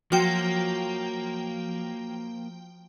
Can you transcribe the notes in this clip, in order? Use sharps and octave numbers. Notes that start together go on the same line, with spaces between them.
F3 F#3 A#3 G5